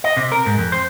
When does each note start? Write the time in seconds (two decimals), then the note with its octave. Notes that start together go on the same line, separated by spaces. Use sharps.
0.04 D#5
0.17 C3
0.32 A#4
0.46 G#2
0.58 F2
0.72 C5